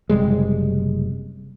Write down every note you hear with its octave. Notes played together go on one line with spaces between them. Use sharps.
F#1 C3 G3 G#3